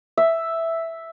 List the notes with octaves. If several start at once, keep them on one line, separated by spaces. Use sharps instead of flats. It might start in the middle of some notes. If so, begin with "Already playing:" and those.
E5